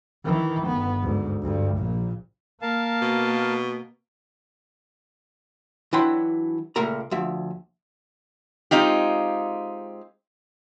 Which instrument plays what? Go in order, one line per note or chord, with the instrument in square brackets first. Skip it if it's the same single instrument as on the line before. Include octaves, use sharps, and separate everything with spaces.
[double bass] D#3 E3
G1 B3
D2 G#2
D2 G2
A#1 A#2
[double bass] A#3 [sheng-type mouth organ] A#4 F5 A5
[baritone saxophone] B2
[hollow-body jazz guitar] E3 F#3 D4 E4 G5 C6
C#2 A#2 A3 A#4 A#5
D2 F3 E5
[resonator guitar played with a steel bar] G#3 C4 D#4 F4 G4